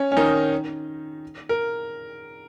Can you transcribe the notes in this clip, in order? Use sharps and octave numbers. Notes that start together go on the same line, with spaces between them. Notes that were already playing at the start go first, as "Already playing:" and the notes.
Already playing: C#4
C#4
D#3 D#4
A#4